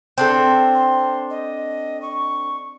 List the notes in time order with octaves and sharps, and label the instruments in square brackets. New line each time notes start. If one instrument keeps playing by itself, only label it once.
[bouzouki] C4 D4 A4 [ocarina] C6
[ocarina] C6
D#5
C#6